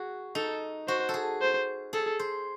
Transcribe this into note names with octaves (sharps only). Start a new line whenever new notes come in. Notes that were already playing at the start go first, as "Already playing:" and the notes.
Already playing: F#4 G#4
D#4 A4
F#4 C5
A4
G#4
C5
G#4 A4
C5